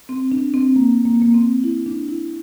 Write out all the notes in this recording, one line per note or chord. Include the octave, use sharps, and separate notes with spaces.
C4
D4
C4
A#3
A#3
A#3
C4
E4
D4
E4